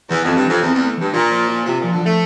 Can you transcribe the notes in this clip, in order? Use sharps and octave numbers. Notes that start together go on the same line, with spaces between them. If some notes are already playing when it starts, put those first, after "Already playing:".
E2 E3
F2 C4
G2
F2 E3
E2 C4
E2
A3
G2 E3
A#2 F4
C5
F4
C3 F4
A#2 F3
D3
F3 A3